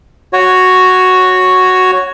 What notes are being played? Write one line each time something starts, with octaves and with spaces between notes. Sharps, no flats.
F#4 C#5